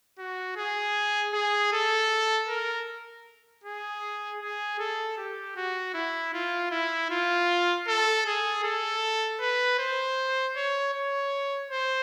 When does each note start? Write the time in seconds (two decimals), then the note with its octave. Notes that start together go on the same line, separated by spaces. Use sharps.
0.18 F#4
0.56 G#4
1.33 G#4
1.72 A4
2.48 A#4
3.64 G#4
4.40 G#4
4.79 A4
5.17 G4
5.56 F#4
5.94 E4
6.33 F4
6.71 E4
7.10 F4
7.87 A4
8.26 G#4
8.64 A4
9.41 B4
9.78 C5
10.56 C#5
10.94 C#5
11.70 C5